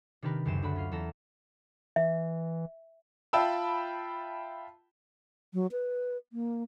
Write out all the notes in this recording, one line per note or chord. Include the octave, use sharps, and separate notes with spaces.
C3 D#3 D4 G4 A#4 B4
C#2 F#2 G4 C5 D#7 E7
D2 D4 F#4 F#5 B5
C#4 F4 F5
E2 A4 A#5 E7
E3 E5
F4 E5 G5 A5 B5 E6
F#3
B4
A#3